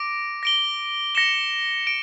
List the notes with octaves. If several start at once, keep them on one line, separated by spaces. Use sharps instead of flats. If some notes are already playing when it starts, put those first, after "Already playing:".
Already playing: D6 A#6 D7
A#6 D7 G7
A#6 C#7 E7 G7
D7